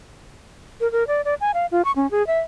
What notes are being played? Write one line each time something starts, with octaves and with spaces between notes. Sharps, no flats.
A#4
A#4
D5
D5
G#5
F5
F4
C#6
C#4
G#4
E5